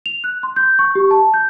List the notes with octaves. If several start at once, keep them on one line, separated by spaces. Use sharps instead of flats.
F7
F#6
C6
G6
C#6
G4
A5
G6